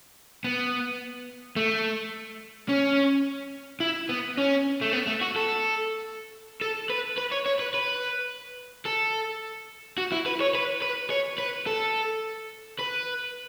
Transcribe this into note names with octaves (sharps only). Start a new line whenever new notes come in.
B3
A3
C#4
E4
B3
C#4
A3
B3
A3
F#4
A4
A4
B4
B4
C#5
C#5
B4
B4
A4
F#4
E4
B4
C#5
B4
B4
C#5
B4
A4
B4